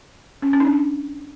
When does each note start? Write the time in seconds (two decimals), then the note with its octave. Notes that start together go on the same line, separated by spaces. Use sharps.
0.42 C#4
0.53 C#4
0.60 D#4
0.65 D4